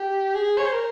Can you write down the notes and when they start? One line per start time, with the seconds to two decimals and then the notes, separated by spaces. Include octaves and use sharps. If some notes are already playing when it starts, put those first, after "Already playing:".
Already playing: G4
0.35 G#4
0.58 C#5
0.65 C5
0.73 A#4